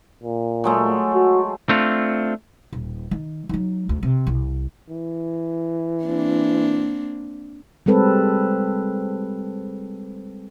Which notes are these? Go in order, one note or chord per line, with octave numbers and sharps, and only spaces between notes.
A#2
F#3 G#3 A3
F#4
A3 C4 D4 F4
D#1
D#3
F#3 D#4
D2
C3
C2
E3
A#3 C4 D4
G3 G#3 C4 A4 B4